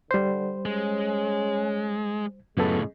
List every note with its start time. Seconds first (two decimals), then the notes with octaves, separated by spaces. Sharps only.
0.11 D3 G3 C5
0.65 G#3 C#4
2.57 C#2 F#2 A2 G#3 B3 A4